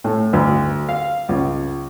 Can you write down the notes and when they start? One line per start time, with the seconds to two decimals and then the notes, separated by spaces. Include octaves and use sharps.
0.04 A2
0.33 D2
0.89 F5
1.29 C#2